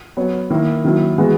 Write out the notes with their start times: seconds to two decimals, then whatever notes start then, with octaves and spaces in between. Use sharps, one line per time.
0.17 F#3 B3 F#4 C#5
0.50 D#3 A#3 E4
0.84 D#3 F#3 A#3 E4
1.18 E3 G#3 B3 F#4